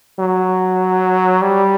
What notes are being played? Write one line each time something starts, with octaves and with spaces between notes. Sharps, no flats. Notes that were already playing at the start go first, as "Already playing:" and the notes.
F#3
G3